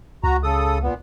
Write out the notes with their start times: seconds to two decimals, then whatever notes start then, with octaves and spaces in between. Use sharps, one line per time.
0.24 C#2 F#4 A#5
0.43 C#3 A4 D#6
0.83 A#2 B3